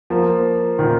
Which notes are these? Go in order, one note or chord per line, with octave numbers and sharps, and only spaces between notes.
F3 A#3
A#2 D#3